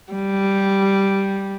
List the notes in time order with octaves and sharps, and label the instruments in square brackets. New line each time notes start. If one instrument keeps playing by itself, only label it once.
[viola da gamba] G3